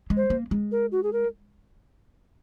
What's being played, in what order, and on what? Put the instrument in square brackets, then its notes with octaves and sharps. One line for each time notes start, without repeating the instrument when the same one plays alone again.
[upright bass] G#3
[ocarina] C5
[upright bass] A#3
G#3
[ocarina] A#4
F#4
G#4
A#4